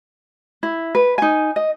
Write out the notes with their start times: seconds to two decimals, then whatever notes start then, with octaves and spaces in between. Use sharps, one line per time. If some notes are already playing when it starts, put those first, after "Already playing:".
0.63 E4
0.95 B4
1.18 D#4 G#5
1.56 D#5